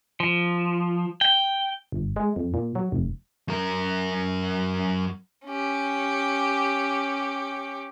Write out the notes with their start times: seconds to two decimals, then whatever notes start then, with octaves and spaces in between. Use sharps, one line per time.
0.20 F3
1.21 G5
1.92 G1
2.16 G#3
2.36 F2
2.54 A#2
2.75 F#3
2.92 F1
3.48 F#2 A#4
5.45 C#4 G4